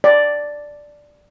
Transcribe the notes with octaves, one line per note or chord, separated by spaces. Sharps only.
D5